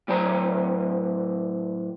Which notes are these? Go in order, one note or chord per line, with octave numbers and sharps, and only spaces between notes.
A2 F#3 C5 A5 A#5